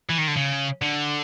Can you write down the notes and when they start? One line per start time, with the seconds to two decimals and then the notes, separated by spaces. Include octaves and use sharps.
0.10 E3
0.18 D#3
0.28 D3
0.36 C#3
0.82 D3